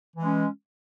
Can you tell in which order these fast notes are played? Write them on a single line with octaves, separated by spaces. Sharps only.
E3 G#3 C#4